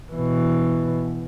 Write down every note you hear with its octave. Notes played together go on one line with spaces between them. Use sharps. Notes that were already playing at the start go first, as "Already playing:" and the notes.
B2 E3